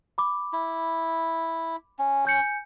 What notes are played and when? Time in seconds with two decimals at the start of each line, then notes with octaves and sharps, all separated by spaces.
0.18 B5 D6
0.53 E4
1.99 C#4
2.25 G#5 G6 C#7